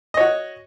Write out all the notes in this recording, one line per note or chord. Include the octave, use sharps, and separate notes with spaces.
F#4 C#5 D#5